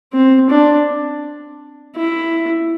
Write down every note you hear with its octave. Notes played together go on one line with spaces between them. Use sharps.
C4
D4
E4